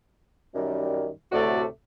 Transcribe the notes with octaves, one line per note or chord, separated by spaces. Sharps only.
F#2 D#3 G3
D2 A2 C3 A3 F#4 D5